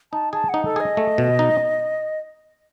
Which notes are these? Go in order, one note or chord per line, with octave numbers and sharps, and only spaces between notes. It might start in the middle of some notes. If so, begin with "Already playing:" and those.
D#4 A5
G#4 A5
D#4 F#5
A4
G#4 D#5
A3
B2
D#4